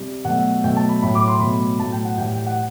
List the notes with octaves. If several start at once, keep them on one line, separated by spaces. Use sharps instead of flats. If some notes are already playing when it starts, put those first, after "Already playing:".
Already playing: C3 G3
B2 F#3 A3 F#5
B2 F#3 A3 G5
A5
B5
A2 F#3 A3 B5
D6
C6
B2 F#3 A3 B5
A2 F#3 A3 A5
G5
F#5
A2 E3 G3 G5
G5
F#5